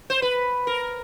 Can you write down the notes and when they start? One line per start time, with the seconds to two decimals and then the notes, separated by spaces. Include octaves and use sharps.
0.10 C5
0.22 B4
0.67 A#4